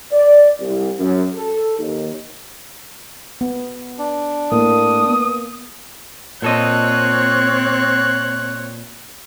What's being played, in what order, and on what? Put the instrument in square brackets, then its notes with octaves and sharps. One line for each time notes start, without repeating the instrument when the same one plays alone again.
[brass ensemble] D5
C2
F#2
A4
D#2
[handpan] B3
[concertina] D4
[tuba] A2 [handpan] A#3 [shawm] D#6
[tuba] B3
[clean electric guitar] A#2 A4 D#5 [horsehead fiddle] C4 C#5 [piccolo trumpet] F#6